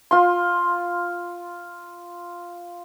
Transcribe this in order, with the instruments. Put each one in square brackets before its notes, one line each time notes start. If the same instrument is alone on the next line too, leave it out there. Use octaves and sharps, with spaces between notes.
[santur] F4 C6